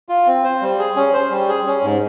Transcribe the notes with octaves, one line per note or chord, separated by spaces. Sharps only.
F4
C4
C5
G3
G#4
C#4
C5
G3
G#4
C#4
G#2